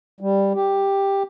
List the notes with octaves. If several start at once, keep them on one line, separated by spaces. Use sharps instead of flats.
G3
G4